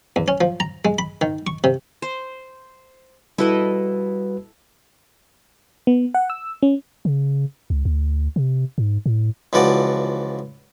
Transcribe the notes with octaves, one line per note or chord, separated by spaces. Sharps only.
E2
C#4
F3
A#5
G#3
B5
D#3
C#6
C3
C5
G3 E4 F#4 A4 B4 D#5
B3
F#5
E6
C#4
C#3
C#2
D2
C3
G#2
A2
C#2 E3 F3 F#4 D5